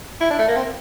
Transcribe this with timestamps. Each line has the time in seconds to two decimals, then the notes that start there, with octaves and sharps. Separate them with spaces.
0.21 E4
0.30 D4
0.39 A3
0.48 A#3
0.56 C4